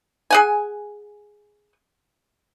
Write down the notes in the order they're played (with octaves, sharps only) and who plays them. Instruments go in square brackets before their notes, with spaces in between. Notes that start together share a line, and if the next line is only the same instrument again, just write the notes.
[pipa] G#4 F#5 G#5